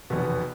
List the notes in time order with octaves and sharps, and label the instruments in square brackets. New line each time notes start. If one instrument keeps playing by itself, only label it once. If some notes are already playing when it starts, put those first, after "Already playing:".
[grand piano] F1 E2 B2 B3